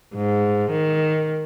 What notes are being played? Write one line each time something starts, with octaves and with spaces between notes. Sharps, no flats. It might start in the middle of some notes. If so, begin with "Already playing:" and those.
G#2
D#3